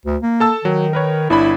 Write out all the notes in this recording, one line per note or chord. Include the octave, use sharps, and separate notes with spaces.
D2
A#3
A4 A5 E6
D#3 F#3
A#4 B4 C#5
G1 D4 E4 B5